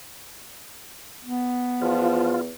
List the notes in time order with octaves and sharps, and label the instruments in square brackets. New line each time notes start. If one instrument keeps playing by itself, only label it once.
[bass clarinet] B3
[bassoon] E2 [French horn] F3 [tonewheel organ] F4